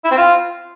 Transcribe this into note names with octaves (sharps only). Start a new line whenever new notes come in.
E4
C4
F4